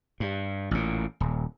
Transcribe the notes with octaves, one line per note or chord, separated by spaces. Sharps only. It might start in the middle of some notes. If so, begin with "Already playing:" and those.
G2
A1 A#2
D#1